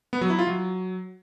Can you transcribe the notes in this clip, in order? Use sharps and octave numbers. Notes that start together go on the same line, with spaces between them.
B3
F#3
E4
F4
F#3